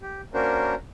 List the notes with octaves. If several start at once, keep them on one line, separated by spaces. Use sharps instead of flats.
G4
A#3 C#4 D4 F#4 A#4 C5